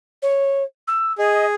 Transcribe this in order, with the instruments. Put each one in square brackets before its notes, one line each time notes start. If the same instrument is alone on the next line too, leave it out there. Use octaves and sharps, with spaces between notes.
[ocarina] C#5
E6
[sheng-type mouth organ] G#4 [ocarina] D#5